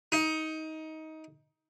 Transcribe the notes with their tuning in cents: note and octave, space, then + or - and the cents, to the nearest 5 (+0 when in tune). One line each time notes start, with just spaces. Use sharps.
D#4 +20